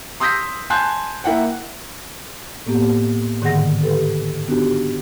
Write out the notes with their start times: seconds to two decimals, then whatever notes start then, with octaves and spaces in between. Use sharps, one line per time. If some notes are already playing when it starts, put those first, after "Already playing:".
0.20 C6 D#6 E6 G6 A#6 B6
0.70 G#5 A5 C6 F#6 G6
1.24 A#3 E4 F#5 G5
2.67 A2 A#3 B3 G4
3.42 G#2 D3 D#3 G#4 F#5 A#6
3.83 G4 A4 B4
4.48 B3 D4 D#4 F#4 G4